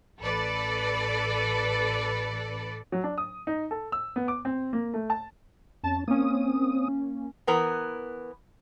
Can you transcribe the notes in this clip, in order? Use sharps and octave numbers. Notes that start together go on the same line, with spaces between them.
A1 A4 B4 D5
F#3
D4
D#6
D#4
A4
E6
B3
D6
C4
A#3
A3
A5
F2 C#4 A5 A6
A#3 C4 C#4 D#6
E3 B3 A#4